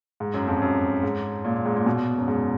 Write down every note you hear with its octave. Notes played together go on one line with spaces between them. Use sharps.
G#2
F#2
F2
F#2
G#2
A#2
G#2
A#2
B2
F#2
G#2